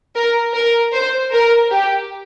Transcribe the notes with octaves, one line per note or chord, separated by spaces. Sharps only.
A#4
A#4
C5
A#4
G4